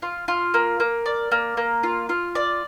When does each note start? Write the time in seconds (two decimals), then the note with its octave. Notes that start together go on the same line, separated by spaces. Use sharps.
0.02 F4
0.28 F4
0.54 A#3
0.80 A#3
1.06 D5
1.32 A#3
1.57 A#3
1.83 F4
2.09 F4
2.35 D5